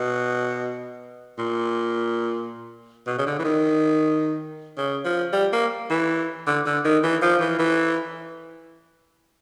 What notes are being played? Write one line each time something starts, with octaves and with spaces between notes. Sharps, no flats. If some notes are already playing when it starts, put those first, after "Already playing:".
Already playing: B2
A#2
B2
C#3
D3
E3
D#3
C#3
F3
G3
A#3
E3
D3
D3
D#3
E3
F3
E3
E3